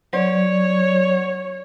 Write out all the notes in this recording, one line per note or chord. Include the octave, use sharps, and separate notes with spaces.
F#3 C#5 D5